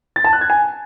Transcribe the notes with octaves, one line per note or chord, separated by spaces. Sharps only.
A6
A5
F#6
G#6
G#5